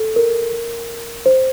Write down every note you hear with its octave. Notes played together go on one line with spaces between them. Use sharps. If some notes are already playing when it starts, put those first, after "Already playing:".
Already playing: A4
A#4
C5